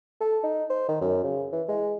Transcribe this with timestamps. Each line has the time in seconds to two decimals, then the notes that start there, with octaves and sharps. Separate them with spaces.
0.21 A4
0.43 D#4
0.70 C5
0.89 D#3
1.01 F#2
1.24 C#3
1.52 E3
1.69 G#3